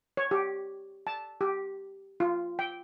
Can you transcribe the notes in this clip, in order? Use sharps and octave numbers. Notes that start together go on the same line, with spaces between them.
C#5
G4
A5
G4
F4
G5